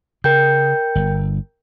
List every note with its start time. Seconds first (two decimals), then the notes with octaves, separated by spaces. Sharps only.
0.24 C#3 A#4 G5 G6
0.95 G1